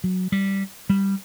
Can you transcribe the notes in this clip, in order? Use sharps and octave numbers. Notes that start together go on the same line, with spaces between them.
F#3
G3
G3